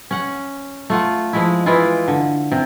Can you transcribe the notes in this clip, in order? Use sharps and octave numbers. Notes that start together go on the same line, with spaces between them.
C#4 F#5
A3 F4 F#5
F3 G#3 E4
E3 G#3 E4 F4
D3
C3